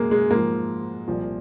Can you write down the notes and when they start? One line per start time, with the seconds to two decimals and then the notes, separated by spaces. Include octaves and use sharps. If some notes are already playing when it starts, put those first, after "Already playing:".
Already playing: F#2 C#3 F#3 G#3 A#3
0.11 G#3
0.31 G#2 F3 A#3
1.08 C2 A#2 F3